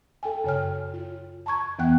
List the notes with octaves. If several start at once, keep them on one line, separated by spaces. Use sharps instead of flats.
A4 G5 G#5
F#2 C#3 C#5 G5 F6
F4
A5 A#5 C#6 G#6
F2 E3 B3 F#5 G5 F#6